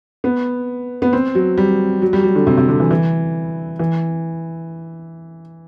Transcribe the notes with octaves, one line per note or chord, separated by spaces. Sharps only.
B3
B3
C4
F#3
G3
F#3
G3
F#3
D3
C3
C3
D3
E3
E3
E3